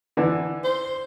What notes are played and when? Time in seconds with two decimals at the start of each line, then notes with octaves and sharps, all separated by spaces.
0.17 D3 E3 D4
0.64 C5